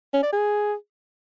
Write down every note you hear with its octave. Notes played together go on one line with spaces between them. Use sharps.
C#4
D5
G#4